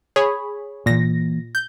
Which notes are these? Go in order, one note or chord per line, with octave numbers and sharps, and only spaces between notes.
G#4 C#5 B5
A#2 E3 A#3 A#6
G6